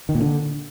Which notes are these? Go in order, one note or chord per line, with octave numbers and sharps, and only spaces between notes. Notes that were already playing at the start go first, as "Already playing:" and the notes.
D#3
A#2
D3